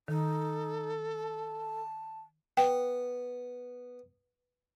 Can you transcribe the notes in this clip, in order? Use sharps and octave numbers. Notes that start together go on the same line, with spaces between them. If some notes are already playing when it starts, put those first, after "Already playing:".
D#3 D#4 A4
A5
B3 G5